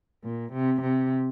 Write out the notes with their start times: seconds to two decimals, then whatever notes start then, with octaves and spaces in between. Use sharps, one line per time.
0.24 A#2
0.53 C3
0.81 C3